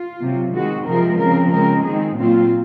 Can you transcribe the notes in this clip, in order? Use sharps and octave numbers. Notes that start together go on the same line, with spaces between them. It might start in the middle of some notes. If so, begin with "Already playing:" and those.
Already playing: F4
C3 F#3 C4
D#3 G#3 C4 F#4
C3 F3 G#3 C4 A#4
C#3 F3 C4 A#4
C#3 G#3 C4 A#4
D#3 G#3 C4 G#4
A#2 F#3 C4 F4